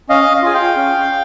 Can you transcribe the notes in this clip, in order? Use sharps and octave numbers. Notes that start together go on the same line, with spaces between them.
C#4 D#5 F5
F4 G#4 G#5
F5 G5
C#4